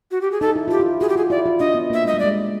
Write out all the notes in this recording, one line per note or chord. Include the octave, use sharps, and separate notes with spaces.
F#4
G4
G#4
D#4 A4
E4
F4 G4
E4
F#4 G#4
G4
F4 G#4
E4 D5
F4
D4 D#5
B3
A#3 E5
G#3 D#5
G3
D5
G#3